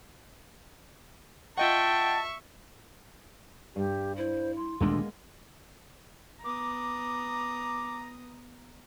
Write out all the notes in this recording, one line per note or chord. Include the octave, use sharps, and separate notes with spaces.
F4 D#5 E5 F#5 G5 A5 C#6
G2 G4
E4 C5
C6
D#1 D2 G#3 A#3 B3 D4
B3 A#5 D6 D#6